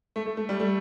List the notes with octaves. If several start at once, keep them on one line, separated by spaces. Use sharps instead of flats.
A3
A3
A3
G3
A3